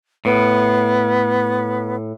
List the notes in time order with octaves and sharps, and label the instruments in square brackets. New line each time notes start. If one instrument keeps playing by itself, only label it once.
[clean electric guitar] A2 [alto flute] B3